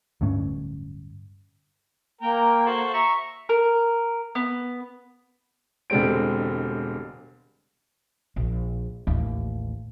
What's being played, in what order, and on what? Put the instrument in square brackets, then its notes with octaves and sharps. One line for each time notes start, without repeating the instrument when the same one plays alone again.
[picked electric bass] D1 D2 G2 C#4
[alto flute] A#3 [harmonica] A#4 G5
[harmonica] F#4 A4 C5
E5 A#5 C#6
[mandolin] A#4
B3
[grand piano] E1 D3 G3 G#3 C4 D7
[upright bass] A#1
A1 D#2